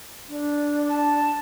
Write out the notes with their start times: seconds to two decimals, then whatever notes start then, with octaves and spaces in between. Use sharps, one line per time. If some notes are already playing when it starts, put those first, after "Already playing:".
0.29 D4
0.89 A5